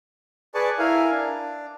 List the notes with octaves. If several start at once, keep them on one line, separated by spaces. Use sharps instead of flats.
G#4 B4 D5 G#5 A5 C#6
E4 A#4 F5 G#5
D4